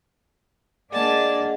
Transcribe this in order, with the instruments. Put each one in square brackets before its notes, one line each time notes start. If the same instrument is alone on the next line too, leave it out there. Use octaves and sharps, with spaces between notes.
[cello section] A#3 D4 [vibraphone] G#4 D#5 F#5 [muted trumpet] D5 [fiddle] G#5 A5